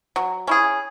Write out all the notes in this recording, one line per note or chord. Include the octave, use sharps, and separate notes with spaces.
F#3
C#4 E4 G#4